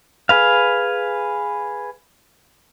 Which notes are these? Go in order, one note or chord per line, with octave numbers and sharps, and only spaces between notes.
G#4 B4 F5